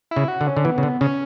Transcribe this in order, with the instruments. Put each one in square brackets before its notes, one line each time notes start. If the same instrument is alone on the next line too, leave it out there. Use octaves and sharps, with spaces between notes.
[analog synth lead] E4
[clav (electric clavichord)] C#3
[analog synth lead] F#4
[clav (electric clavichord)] D3
[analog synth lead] C#4
[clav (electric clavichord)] D3
[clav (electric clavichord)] E3 [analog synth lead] B3
[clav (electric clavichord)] C#3
D3
[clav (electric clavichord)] C#3 [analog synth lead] C#4